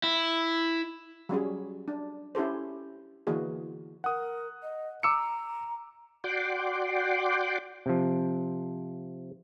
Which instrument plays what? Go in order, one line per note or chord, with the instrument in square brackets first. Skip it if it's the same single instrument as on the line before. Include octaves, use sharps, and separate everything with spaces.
[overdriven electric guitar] E4
[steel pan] F#3 G3 C#4 G#4
D4
C#4 E4 G4 A4 C5
D3 E3 A#3 F#4 G#4
[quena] A#4 [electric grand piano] F#5 D#6
[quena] D#5
[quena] A#5 [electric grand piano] D6 E6 C#7
[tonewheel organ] F#4 D5 F#5 G5 C6 D6
[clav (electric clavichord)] C3 F3